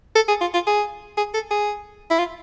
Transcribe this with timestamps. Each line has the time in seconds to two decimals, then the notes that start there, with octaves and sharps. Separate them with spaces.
0.16 A4
0.28 G#4
0.41 F4
0.54 F4
0.67 G#4
1.17 G#4
1.34 A4
1.51 G#4
2.10 E4
2.19 F4